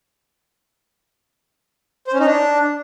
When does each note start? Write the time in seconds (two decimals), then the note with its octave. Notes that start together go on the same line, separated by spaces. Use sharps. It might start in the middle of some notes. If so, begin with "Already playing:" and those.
2.07 C5
2.13 C#4
2.20 D#4
2.26 D4